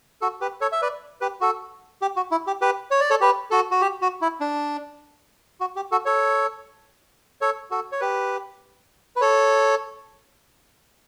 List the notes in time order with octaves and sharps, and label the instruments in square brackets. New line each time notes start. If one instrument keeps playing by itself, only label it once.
[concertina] F#4 A4
G4 B4
A4 C#5
E5
B4 D5
G4 B4
F#4 A4
G4
F#4
E4
G4
G4 B4
C#5
D5
A4 C#5
G4 B4
F#4 A4
F#4
G4
F#4
E4
D4
F#4
G4
F#4 A4
A4 C#5
A4 C#5
F#4 A4
C#5
G4 B4
B4
A4 C#5